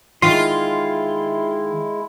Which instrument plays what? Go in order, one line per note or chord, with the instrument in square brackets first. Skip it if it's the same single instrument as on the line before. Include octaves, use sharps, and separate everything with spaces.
[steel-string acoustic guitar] D#3 [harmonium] G#3 E4 [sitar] F4 [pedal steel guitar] C6